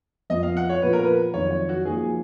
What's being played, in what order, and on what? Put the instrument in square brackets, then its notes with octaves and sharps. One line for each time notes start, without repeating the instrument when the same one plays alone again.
[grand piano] F2 F3 B3 [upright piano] D#5
[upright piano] F5
F#5
C#5
[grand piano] A#2 F3 B3 F4 [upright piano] B4
[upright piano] A#4
B4
[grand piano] F2 D#3 F#3 [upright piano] C#5
[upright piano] C#5
F#4
[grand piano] F3 A#3 D#4 F#4 [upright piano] G#4